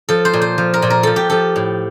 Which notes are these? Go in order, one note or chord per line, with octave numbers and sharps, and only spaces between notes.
F3 A4
C5
A#2
C5
F3
A#4
A#2
A#4
F3 A4
G4
F3 A4
A2